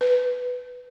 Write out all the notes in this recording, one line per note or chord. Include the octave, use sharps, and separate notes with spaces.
B4